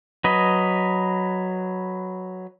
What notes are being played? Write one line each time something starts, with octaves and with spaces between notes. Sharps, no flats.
F#3 B4 D#5